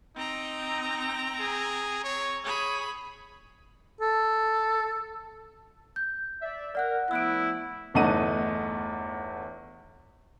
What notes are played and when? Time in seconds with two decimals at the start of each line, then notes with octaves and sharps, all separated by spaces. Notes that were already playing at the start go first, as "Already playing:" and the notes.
0.16 C4 D#4 A#5
1.40 G#4
2.04 C#5
2.44 G#4 C#5 B5
4.01 A4
5.96 G6
6.42 D5 E5
6.75 A#4 D5 F#5 F#6
7.11 F3 A3 B3 E4 E6 F#6 D7
7.94 G1 E2 A3 D#4 F#5 D#7